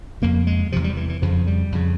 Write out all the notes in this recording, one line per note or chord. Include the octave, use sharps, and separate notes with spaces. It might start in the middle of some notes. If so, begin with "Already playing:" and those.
F2 C#3 A#3
G#3
E2 C3 F3
G3
E3
E3
F2 C#3 F3
G3
F2 C#3